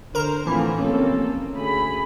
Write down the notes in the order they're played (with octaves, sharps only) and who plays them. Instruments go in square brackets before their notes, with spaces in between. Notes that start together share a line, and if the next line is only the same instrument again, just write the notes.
[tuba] D3 [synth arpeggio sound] A#4 A#5 [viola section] C5
[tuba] A2 [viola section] D3 F3 C4 [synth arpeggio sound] E3
[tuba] F1 [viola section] A#3 C4 A4 [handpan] C#4
[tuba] D2 [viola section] A3 G#4 B5